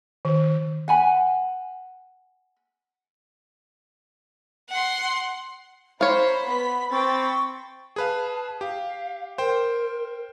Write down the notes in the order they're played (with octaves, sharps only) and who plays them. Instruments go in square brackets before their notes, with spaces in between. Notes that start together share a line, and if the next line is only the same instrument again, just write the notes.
[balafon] D#3
[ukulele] F#5 G#5 B5
[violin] F#5 C6
[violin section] C5 A#5 [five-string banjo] C#5 F5 [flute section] B5
[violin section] B3 B6
[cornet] C4 [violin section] G5 B5 A6 [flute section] C#6
[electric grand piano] G#4 B4 F5 [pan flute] A5
[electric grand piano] G4 [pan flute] F5
[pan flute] A#4 [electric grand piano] C5 G5